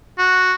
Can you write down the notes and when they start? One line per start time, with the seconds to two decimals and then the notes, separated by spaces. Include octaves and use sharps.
0.18 F#4